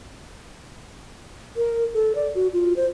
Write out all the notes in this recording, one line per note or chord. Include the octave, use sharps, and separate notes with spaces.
A#4
A4
D5
F#4
F4
C5